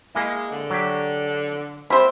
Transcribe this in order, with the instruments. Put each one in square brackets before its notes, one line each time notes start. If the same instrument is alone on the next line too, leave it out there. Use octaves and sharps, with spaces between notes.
[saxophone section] G#3 [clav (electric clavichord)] A#3 E4
[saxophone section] D3
[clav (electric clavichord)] F#3 G4
[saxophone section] G3 A#3 E5 [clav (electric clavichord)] C4 [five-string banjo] C5 B5